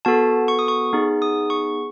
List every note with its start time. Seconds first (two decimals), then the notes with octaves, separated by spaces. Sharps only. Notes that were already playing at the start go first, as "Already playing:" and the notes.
0.05 B3 F#4 A4 A5
0.48 C#6
0.59 D#6
0.68 C#6
0.93 B3 D#4 G#4
1.22 D#6
1.50 C#6